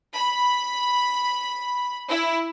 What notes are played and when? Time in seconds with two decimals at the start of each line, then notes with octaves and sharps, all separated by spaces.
0.13 B5
2.09 E4